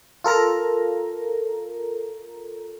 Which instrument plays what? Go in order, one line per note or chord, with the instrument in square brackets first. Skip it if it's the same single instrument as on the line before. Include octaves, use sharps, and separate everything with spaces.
[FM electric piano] F4 A4 A#4 A#5